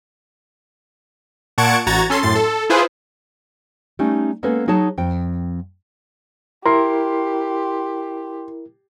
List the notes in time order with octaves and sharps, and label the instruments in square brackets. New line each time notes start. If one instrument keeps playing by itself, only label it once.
[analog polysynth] A#2 F#5 A5 C#6 G#6 D7
A1 F#4 A#5 G#6 A6
C#4 A4 C6
F#2 A2 C6 A6
A4
E4 F4 G#4 B4 C5
[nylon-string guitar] G3 A3 C#4 D#4
G#3 A#3 B3 C#4 A4 B4
F#3 D#4 G#4 C#5 A5
F2 G5
[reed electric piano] E4 A#4 [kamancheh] G4 [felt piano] C6